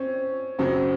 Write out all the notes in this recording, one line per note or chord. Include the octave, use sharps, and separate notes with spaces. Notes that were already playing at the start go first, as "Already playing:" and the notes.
Already playing: C4 C#4
F#2 C#3 F#3 C4